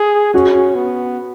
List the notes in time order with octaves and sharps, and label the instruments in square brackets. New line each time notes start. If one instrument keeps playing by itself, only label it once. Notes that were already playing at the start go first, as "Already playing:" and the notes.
Already playing: [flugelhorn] G#4
[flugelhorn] C#4 [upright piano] F#4
[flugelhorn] B3